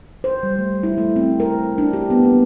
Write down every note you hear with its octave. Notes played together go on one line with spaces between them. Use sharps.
C5
G3
A3
E4
A3
C4
A#4
D4
G4
B3
A#3